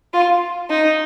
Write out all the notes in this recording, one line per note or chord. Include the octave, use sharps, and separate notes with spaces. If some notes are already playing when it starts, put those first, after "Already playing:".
F4
D#4